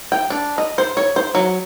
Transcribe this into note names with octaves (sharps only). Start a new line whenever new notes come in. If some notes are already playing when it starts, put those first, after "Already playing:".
G5
D4
D#5
C5
C#5
C5
F#3